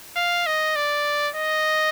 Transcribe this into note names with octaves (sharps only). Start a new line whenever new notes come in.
F5
D#5
D5
D#5